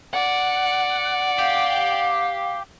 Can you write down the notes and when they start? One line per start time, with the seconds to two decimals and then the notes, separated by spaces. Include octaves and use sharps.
0.13 D5 F#5
1.39 G4 F5